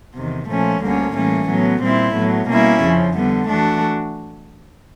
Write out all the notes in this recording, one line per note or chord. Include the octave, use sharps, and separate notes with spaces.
E2 C3 D#3
A#2 F3 A3 C#4
D2 D3 G3 A#3 C#4
A2 E3 G3 A#3 C#4
A2 F#3 B3
A#2 G3 C4 E4
A2 F#3 B3
B2 G3 A#3 C#4 E4
F2 C#3 F3
D3 G3 B3
E3 A3 D4 F#4